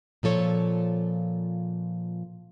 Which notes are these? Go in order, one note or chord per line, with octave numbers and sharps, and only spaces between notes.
A#2 F3 A4 C#5